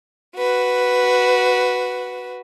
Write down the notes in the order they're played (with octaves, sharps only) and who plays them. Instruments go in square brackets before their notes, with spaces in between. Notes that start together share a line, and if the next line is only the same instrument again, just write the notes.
[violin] F#4 B4